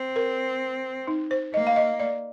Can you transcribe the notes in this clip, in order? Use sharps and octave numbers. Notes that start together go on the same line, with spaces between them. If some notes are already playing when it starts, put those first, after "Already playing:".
Already playing: C4
A#4
D#4
C5
A#3 D#5
F5
D#5
D5